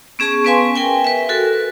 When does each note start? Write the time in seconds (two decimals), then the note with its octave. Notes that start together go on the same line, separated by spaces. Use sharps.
0.19 B3 C#4 G#4 A5 C#6
0.45 B3 C#4 B4 F5 G#5 C6
0.76 A#4 G5 G#5
1.04 B4 E5
1.29 F#4 A4 A#4